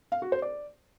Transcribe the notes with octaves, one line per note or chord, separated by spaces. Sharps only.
F5
F#4
C5
D5